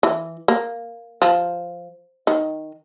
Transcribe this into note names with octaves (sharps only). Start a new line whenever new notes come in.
E3
A#3
F3
D#3